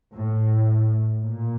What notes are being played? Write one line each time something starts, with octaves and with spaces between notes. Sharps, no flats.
A2
A#2